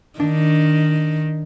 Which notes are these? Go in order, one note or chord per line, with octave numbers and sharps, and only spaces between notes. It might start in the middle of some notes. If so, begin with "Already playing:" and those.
D#3 D4